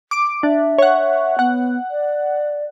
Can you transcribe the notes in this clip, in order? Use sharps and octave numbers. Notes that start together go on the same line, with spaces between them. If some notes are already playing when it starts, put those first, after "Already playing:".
D6 D7
D4 E5
C#5 F#5
B3 F#5
D5